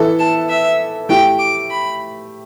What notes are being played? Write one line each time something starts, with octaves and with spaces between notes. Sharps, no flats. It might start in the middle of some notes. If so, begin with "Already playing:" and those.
Already playing: E3 B3 E4 A4 E5
A5
E5
A3 E4 G4 G5
D6
B5